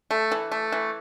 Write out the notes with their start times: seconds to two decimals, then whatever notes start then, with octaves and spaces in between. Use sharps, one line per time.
0.11 A3
0.32 E3
0.52 A3
0.72 E3